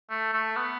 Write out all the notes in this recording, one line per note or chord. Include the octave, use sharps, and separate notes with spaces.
A3
A3
B3